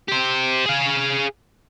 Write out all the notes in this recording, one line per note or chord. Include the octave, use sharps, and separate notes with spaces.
G4 C5
G#4 F5